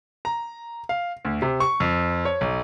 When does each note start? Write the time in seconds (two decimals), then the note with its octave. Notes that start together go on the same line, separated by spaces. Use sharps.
0.25 A#5
0.89 F5
1.25 D2
1.42 C3
1.60 C#6
1.80 F2
2.25 C#5
2.41 B1